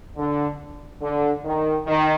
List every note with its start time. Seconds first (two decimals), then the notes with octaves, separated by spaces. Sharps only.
0.17 D3
1.01 D3
1.45 D#3
1.87 D#3